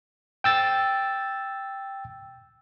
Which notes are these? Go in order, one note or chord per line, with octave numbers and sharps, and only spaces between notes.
G5 E6 A6